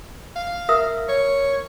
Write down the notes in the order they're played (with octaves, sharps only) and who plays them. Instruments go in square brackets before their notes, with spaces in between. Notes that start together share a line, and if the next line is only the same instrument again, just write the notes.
[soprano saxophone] F5
[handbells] A#4 [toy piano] E5 D#6 E6
[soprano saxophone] C#5